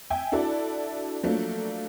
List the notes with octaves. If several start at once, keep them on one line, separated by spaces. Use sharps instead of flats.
E5 G5 G#5
D4 E4 F#4 A4 D5
F3 F#3 A3 A#3 D4